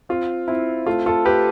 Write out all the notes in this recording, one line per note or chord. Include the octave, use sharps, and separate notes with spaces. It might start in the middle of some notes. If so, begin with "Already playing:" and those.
C4 F4
C4 E4
A3 F4
F4 A4
A3 G4 B4